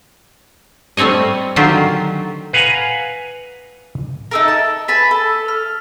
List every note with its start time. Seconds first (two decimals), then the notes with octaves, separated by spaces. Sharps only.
0.97 G3 A3 C4 C#5 D#5
1.56 D3 D#3 F#3 F4 G4
2.53 B4 F5 F#5 G#5 A#5
4.31 D#4 A4 A#4
4.48 A5
4.88 B4 G#5 A5 B5
5.11 A4
5.48 F6